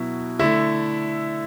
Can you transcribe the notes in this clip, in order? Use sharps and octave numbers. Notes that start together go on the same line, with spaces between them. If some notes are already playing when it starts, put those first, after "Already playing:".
Already playing: B2 F#3 E4
D3 A3 E4